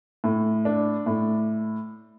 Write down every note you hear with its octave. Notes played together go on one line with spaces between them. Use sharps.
A2
D4
A2